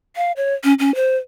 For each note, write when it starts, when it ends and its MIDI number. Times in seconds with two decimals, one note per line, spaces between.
0.16 0.32 77
0.37 0.54 73
0.64 0.74 61
0.79 0.93 61
0.95 1.16 72